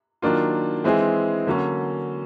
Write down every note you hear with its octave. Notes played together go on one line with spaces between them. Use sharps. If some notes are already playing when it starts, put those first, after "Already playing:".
D#3 F#3 A#3 D4 F4
E3 G#3 C4 E4 G#4
D3 F#3 A#3 C#4